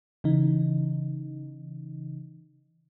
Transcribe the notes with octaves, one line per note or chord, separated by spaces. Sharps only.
C#3 E3 D#4